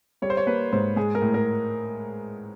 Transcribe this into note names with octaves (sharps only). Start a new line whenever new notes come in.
G3 C#5
C5
C#5
A#3 B4
G#2 C5
G#3 G#4
A#4
A2
A#4